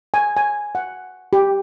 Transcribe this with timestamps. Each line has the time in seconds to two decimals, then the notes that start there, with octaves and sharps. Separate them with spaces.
0.14 G#5
0.37 G#5
0.75 F#5
1.33 G4